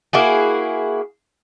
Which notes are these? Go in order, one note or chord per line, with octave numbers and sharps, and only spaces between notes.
A#3 E4 F#4 G#4